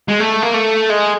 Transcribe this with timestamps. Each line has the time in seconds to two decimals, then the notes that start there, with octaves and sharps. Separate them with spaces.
0.09 G#3
0.20 A3
0.43 A#3
0.54 A3
0.90 G#3